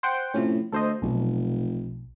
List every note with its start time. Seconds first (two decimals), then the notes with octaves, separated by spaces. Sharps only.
0.03 C5 F#5 G5
0.34 A2 C3 F3 C#4
0.72 D2 A4 C5 D#5
1.02 F1 B1